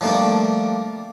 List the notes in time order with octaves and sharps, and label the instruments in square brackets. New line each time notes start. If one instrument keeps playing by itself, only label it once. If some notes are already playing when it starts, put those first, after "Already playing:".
[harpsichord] F3 G3 A3 A#3 D4